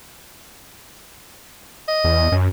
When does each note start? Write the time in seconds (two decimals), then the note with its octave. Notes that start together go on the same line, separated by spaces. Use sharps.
1.88 D#5
2.04 E2
2.32 F#2